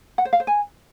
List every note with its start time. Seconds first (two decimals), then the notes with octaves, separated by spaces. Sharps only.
0.18 F#5
0.25 C5
0.33 F5
0.40 C5
0.47 G#5